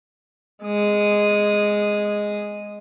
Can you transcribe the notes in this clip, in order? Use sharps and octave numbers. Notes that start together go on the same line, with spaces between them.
G#3 D#6